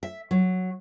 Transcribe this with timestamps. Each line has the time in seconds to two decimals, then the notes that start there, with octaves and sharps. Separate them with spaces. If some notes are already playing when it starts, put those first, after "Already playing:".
0.03 E5
0.31 F#3